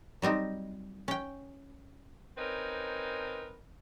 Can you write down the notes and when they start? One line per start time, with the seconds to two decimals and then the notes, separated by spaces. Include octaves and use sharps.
0.22 F#3 G3 C4 D#4
1.08 C#4 G5
2.38 C4 C#4 D#4 A#4 B4